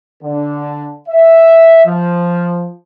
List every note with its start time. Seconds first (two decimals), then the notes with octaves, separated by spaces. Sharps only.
0.22 D3
1.08 E5
1.84 F3